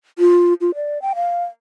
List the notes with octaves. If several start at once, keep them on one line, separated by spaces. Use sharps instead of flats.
F4
F4
D5
G5
F5